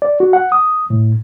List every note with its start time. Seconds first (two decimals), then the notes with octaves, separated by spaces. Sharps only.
0.02 D5
0.20 F#4
0.33 F#5
0.52 D#6
0.90 A2